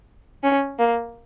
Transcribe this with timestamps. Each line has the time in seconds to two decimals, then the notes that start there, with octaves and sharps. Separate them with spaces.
0.43 C#4
0.79 A#3